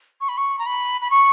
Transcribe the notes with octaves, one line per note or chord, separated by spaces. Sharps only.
C#6
B5
C#6
A#5
B5
B5
C#6